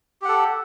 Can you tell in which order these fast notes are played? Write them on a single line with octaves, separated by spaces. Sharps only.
G4 F#5 A4